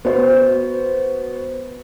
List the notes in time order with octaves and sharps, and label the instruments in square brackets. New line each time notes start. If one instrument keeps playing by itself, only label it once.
[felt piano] B3 F#4 C5